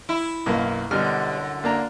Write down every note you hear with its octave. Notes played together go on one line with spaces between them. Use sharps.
E4
B1 F#2 A#3
F#2 B2 D3 G3 F6
A#3 D4 A#5